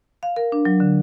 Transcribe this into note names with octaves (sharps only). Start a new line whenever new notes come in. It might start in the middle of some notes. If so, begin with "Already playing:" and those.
F5
A#4
D4
F#3
D3